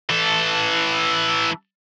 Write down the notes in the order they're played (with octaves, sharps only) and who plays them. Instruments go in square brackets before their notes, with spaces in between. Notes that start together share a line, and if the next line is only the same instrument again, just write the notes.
[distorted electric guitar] E3 A4